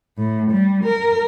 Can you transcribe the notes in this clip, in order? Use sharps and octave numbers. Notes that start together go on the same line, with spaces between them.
A2
G3
A#4